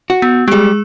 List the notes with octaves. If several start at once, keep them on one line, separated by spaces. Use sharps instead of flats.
F#4
B3
G3 G#3 G4 G#4